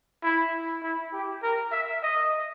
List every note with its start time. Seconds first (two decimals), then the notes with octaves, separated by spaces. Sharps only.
0.23 E4
0.83 E4
1.13 G4
1.43 A#4
1.72 E5
2.03 D#5